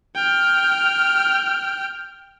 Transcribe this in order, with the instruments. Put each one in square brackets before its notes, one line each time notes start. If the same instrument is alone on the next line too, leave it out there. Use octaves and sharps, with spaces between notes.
[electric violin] G5 F6